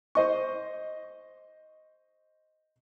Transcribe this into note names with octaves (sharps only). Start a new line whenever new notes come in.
C5 D#5 C#6